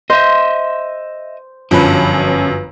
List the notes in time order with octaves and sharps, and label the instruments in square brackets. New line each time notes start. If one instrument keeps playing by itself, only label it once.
[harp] C5 [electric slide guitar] D#5 E5
[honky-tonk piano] G1 F#2 [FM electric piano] F3 B4 [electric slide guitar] C#4 D4